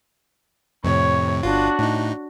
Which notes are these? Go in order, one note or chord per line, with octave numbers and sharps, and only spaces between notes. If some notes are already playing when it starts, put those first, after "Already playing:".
F2 A2 C3 C#5
G1 D4 F4 F#4
A2 D#4